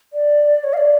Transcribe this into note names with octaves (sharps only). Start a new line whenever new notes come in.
D5
C#5
F5
D5